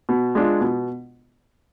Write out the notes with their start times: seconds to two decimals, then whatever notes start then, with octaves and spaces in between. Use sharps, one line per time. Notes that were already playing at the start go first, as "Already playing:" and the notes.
0.09 B2
0.35 G#3 D4 F4
0.61 B2